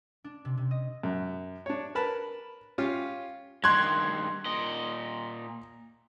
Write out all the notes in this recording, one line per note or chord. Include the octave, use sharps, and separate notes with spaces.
D4
C3
C3
D#5
F#2
D4 C#5
A#4 B4 A5 B5
C#4 F4 G4 F5
G2 D#3 C6 F#6 G#6
A#2 D#5